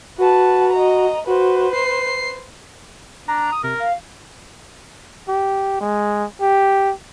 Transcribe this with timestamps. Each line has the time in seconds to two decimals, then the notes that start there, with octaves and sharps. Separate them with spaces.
0.18 F#4 B4 A5
0.72 D#5 A#5
1.27 F#4 B4 C5
1.73 C7
3.28 D4 A#5
3.52 D#6
3.64 C3 A#4
3.80 F5
5.28 G4
5.80 G#3
6.41 G4